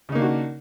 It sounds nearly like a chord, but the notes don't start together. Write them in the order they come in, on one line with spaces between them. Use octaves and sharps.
C#3 D#4 A#3 D4 F#4